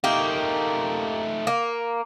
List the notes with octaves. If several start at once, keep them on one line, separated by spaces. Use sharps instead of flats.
A3 A#3 D#4 G4
A#3